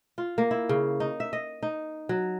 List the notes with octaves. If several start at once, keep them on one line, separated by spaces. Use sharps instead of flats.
F4
A#3
E4
C#3
D#4
E5
D#5
D#4
F#3